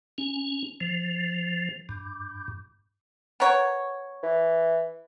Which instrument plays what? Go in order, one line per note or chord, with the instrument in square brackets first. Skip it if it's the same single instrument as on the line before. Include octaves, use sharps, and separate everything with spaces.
[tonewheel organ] C#4
F3
G2
[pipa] B3 A#4 C#5
[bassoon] E3